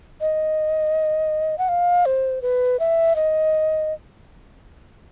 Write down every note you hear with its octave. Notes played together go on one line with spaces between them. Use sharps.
D#5
F#5
F5
C5
B4
E5
D#5